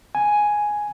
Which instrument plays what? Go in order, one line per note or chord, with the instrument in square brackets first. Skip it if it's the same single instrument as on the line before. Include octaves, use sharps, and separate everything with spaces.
[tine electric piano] G#5